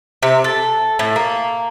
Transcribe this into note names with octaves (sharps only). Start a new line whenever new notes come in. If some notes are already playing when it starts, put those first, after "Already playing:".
C3
A4
A2
A#3